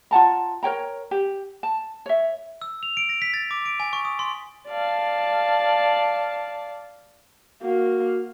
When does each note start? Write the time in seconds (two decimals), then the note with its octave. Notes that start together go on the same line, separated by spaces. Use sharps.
0.11 F4 F#5 A5 A#5
0.63 A#4 C#5 G5 A#5
1.11 G4
1.63 A5
2.06 C#5 E5
2.62 E6
2.83 F7
2.97 D7
3.09 A#6
3.22 B6
3.34 A6
3.51 D6
3.66 D7
3.80 G#5
3.93 C#6
4.05 D#6
4.19 C6
4.68 D5 F5 A5
7.63 A#3 F#4